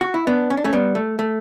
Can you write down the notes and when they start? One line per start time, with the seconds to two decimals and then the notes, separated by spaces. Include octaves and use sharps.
0.01 F#4
0.14 E4
0.27 B3 D4
0.50 C#4
0.57 D4
0.64 A3 C#4
0.73 G3 B3
0.95 A3
1.19 A3